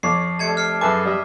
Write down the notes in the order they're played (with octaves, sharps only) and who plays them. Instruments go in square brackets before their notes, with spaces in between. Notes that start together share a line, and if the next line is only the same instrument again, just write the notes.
[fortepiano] F2 C#5 D6 [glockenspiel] C7
[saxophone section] C3 G3 A3 [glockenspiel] A5 G#6 C#7
[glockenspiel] F6 C7 C#7
[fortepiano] F#2 B4 A5 [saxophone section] G#4 A4 E5 [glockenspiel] D6
[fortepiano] G3 [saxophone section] D#5 E5